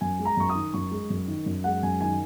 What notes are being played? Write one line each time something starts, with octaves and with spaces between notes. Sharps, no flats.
F#2 G#5
G#3
A#5
F#2 C#6
D#6
D#3
F#2 C#6
G#3
F#2
D#3
F#2
G#3 F#5
F#2 G#5
D#3 G#5